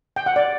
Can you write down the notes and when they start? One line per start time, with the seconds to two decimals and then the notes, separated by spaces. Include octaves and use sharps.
0.16 G5
0.26 F#5
0.36 D5